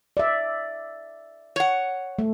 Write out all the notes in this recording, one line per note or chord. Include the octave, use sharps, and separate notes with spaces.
D5 E5
C#5 F#5
A3